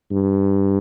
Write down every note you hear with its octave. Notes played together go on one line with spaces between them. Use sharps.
G2